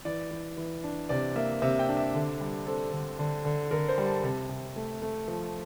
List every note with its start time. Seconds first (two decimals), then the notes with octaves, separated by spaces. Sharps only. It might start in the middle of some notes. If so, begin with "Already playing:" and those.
0.05 E3 D5
0.31 E3
0.57 E3
0.84 D4
1.09 C3 D5
1.36 A#3 E5
1.62 C3 E5
1.79 G5
1.89 D4
1.97 E5
2.14 D3
2.40 G3
2.66 C4 A4
2.92 D3
3.19 D3
3.45 D3
3.71 D3 A#4
3.88 C5
3.98 G3
4.06 A5
4.23 C3 A5
4.49 C3
4.76 A3
5.02 A3
5.28 F3